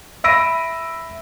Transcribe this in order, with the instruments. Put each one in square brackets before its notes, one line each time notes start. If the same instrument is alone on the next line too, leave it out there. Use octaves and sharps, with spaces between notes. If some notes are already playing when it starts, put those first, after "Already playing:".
[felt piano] E5 B5 E6 A#6 D7 D#7